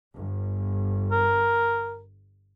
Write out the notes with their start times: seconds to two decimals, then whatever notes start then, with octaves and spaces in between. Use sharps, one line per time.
0.14 G1
1.12 A#4